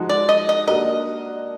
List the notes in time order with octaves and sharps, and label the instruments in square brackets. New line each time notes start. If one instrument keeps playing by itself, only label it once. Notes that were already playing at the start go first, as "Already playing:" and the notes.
Already playing: [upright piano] F3 G#3 D#4 F#4
[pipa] D5
D#5
D#5
[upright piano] A#3 D4 F#4 A#4 [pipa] D#5